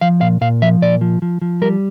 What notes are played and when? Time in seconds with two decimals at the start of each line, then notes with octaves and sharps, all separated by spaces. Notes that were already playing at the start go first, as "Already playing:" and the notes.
0.01 F3 F5
0.21 A#2 F5
0.41 A#2 F5
0.62 F3 E5
0.82 A#2 D5
1.01 F3
1.22 F3
1.42 F3
1.62 G3 A#4